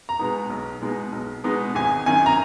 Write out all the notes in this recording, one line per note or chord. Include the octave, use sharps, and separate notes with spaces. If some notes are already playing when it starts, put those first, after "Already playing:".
A#5
B2 G#3 B3 D#4
B1
B2 G#3 B3 D#4
B1
B2 G#3 B3 D#4
G#1 G#5
F#2 D#3 G#5
A#5